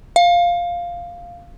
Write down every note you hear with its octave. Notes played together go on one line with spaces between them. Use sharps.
F5